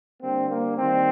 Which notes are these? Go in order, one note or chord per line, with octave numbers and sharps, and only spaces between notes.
D3 G3 A#3 C4
A#3
D#3 G3 A#3 C4